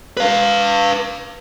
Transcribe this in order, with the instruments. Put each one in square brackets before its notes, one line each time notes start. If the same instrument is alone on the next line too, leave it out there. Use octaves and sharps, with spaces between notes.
[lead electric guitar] B4 F5